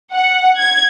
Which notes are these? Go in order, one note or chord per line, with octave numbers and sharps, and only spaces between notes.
F#5
G#6